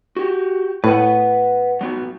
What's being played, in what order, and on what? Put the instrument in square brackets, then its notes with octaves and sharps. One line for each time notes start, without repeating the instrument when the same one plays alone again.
[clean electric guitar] F#4 G4
[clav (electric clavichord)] A2 [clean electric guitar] B4 F#5
[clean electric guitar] F#3 B3 F#4